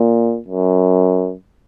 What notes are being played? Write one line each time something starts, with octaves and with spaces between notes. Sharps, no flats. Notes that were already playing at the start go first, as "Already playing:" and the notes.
Already playing: A#2
F#2